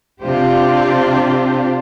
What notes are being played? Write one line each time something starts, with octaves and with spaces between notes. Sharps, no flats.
C3 C4 D4 F4 G4 C5